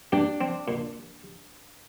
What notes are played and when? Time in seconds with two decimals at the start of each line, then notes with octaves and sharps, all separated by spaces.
0.12 D4 G4
0.41 C4
0.68 A#2